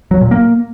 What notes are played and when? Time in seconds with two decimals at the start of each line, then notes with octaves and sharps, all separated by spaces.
0.11 F#3
0.21 A#2
0.31 A#3